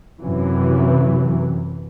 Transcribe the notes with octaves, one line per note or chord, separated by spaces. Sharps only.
F#2 C3 E3